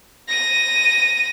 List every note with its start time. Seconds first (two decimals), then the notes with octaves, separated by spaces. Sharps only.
0.29 A#6 D#7